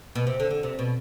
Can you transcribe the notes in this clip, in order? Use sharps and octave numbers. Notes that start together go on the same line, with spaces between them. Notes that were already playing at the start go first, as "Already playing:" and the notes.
B2
C3
D3
D3
C3
B2